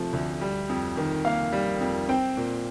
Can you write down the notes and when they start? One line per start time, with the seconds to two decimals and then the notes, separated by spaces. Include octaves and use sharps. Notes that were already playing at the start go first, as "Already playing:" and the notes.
Already playing: C3 F3 A3
0.13 D2
0.41 G3
0.69 F2
0.97 D#3
1.25 A#3 F5
1.53 G3
1.80 F2
2.09 C4 G5
2.37 A#2